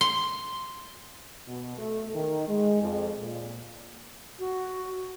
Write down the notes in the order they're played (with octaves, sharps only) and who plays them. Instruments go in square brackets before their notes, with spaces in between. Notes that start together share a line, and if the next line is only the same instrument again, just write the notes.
[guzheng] C6
[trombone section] B2
A3
D#3
G#3
F2
A#2
[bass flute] F#4